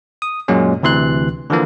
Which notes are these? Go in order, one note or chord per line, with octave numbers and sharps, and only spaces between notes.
D#6
F#2 A#2 F#3 G#3 C#4
D2 C3 E3 C6 F#6
D3 E3 F3 A#3